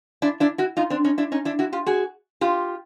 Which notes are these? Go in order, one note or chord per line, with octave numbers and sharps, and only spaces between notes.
D4 E4
D4 E4
E4 F#4
D#4 F4
C4 D4
C#4 D#4
D4 E4
C#4 D#4
D4 E4
E4 F#4
F4 G4
F#4 G#4
F4 G4